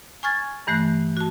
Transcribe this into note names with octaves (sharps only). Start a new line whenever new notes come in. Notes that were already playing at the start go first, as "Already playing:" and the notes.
G#5 C#6 F6 G#6 A6
G2 E3 A3 F#6
F#4 A5